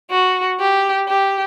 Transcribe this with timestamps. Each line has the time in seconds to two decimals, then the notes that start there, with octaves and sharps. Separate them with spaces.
0.10 F#4
0.59 G4
1.08 G4